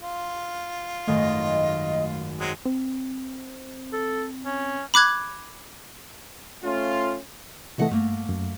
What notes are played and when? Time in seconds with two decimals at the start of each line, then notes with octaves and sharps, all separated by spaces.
0.01 F4
1.08 G#1 F#2 D#3 A3 D#5
2.40 F#3 G#3 C4
2.65 C4
3.93 A4
4.46 C#4
4.94 B5 D6 F#6 G#6
6.63 A3 C#4 F4
7.78 C3 E3 A3 F#4 D#5 F#5
7.91 G2 A3 A#3
8.29 F#2